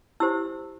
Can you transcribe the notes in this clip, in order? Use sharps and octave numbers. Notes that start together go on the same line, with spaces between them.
E4 G4 C5 E6